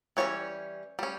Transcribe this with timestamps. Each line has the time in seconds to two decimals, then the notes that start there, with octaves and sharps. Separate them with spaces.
0.17 E3 G3 C#4 C#5
0.99 G3 C#4